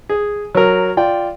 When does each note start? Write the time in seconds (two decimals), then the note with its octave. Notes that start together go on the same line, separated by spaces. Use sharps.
0.09 G#4
0.55 F#3 A#4
0.97 F4 D5 G5